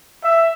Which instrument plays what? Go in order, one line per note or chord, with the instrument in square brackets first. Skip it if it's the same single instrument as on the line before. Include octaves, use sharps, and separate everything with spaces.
[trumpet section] E5